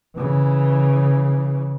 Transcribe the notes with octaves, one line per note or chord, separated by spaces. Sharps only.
C#3 E3